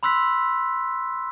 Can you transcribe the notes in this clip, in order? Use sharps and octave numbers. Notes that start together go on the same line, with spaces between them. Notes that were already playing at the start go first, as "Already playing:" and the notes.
B5 C6 E6 F#6 B6